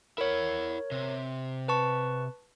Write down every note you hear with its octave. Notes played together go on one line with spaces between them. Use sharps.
E4 A#4 C#5 F#5
C3
B4 A5 C#6